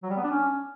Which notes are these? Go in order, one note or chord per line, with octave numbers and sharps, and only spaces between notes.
F#3
G3
B3
D4
C#4